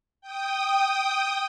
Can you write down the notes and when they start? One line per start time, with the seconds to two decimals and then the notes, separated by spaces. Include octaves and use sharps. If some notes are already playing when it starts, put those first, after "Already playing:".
0.21 G5 D#6